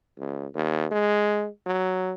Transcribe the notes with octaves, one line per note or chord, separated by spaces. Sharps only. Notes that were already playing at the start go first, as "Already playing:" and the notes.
C#2
D#2
G#3
F#3